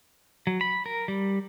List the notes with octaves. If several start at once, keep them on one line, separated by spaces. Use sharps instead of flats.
F#3
B5
A#4
G3